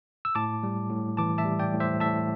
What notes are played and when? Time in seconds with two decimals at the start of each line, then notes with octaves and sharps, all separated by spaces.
0.25 E6
0.35 A2 A5 D6
0.63 G3
0.90 A2
1.17 E3 A5 D6
1.38 E5 A5
1.45 G3
1.59 D5 G5
1.74 A2
1.80 C5 E5
2.00 A2 E5 A5